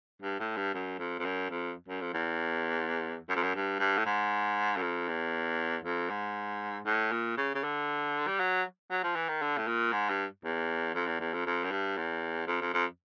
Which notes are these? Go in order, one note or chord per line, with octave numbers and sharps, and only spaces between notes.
G2
A2
G2
F#2
F2
F2
F#2
F2
F#2
F2
E2
F#2
F2
F#2
G2
G2
A2
G#2
F#2
F2
E2
F2
G#2
A2
A#2
C#3
C#3
D3
G3
F#3
F#3
F3
E3
D#3
D3
A2
A#2
G#2
G2
E2
F2
E2
E2
F2
F2
F#2
G2
E2
F2
F2
F2